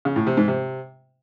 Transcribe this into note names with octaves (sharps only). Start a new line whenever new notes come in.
C#3
A2
C3
G#2
C3